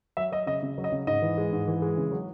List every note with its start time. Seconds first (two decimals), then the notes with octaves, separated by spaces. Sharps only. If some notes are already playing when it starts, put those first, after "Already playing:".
0.17 F#3 E5
0.32 F#3 D#5
0.47 C#3 D#5
0.62 C#3
0.78 F#3
0.84 D#5
0.92 C#3
1.07 G#2 D#5
1.22 E3
1.38 G#3
1.53 G#2
1.67 E3
1.82 G#3
1.97 C#3
2.12 F#3